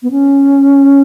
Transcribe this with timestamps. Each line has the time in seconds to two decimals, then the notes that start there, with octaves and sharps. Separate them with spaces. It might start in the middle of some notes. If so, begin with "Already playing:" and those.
0.03 B3
0.11 C#4